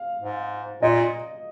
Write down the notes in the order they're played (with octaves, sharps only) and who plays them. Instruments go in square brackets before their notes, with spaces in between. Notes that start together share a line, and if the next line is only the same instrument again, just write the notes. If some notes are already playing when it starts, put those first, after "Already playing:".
Already playing: [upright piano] F5
[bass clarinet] G#2
[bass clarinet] A#2 [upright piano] D#5